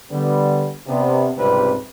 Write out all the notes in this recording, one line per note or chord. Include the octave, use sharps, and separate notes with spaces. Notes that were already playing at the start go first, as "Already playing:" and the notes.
D3 G3 B3
C3 B3 D4
C#2 G#2 C3 G3 C4 B4